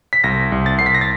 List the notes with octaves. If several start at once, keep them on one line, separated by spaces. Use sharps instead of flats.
B6
C2 A#6
C2
A6
C2 C7
B6
A#6
A6